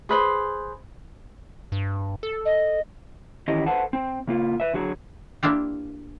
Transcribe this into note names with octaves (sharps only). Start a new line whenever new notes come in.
G#4 B4 C5
G2
A4
D#5
E2 D#3 C#4 E4 G4 D#5
A4 B4 C5 F#5 A5
C4
C#3 A#3 F4
B4 E5
D3 F#3 F#4 G#4
A#3 D4 E4 F4 G4